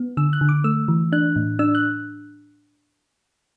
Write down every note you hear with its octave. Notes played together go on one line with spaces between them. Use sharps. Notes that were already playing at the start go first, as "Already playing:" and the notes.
Already playing: B3
D3 E6
F#6
D3
D6
A3 E6
E3
D4 F#6
A2
D4 E6
F#6